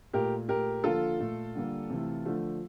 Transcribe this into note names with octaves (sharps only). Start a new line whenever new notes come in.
A#2 A3 G4 A#4
A#2 A3 G4 A#4
D3 F3 A#3 F4 A4
A#2 A3
D3 G3 A#3
C3 E3 A3
D3 F3 A3